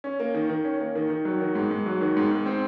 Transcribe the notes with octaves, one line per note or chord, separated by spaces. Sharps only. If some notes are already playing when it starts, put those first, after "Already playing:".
C#4
A#3
D#3
D#3
C#4
A#3
D#3
D#3
F#3
D#3
G#2
G#2
F#3
D#3
G#2
G#2
C4